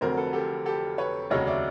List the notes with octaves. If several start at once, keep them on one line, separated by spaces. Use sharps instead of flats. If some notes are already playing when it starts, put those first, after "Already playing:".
F1 F2 D3 F#3 A#4 C5
A4 B4
G4 A4
G4 A4
B4 C#5
F1 D#2 C#3 F#3 C#5 D#5
D5 E5